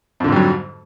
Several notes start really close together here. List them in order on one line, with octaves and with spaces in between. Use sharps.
F2 D3 G#2 G3 F#3